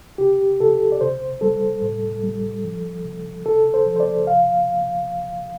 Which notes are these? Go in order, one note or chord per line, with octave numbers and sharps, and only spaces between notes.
C3 G4
C3 A4
D5
C3 C5
G3 A4
A2
G3
F3
C3
C3 A4
C5
F3
C5
D5
C3 F5